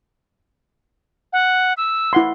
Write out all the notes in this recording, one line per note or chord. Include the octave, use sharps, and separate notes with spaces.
F#5
E6
E4 F#5 C6